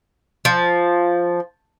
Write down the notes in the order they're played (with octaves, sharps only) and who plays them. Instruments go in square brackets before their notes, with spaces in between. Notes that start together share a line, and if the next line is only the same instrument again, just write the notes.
[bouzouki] F3